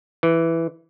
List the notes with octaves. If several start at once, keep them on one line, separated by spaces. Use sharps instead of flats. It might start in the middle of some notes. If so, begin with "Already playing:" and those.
E3